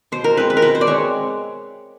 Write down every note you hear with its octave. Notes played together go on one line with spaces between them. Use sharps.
B2 C5
A#4
G#3 C4 B4
B4
A#4
B2 B4
C5
D5
G#3 C4 C#5